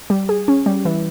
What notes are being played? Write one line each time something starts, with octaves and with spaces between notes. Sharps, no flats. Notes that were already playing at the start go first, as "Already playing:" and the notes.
G3
G#4
C#4
G3
E3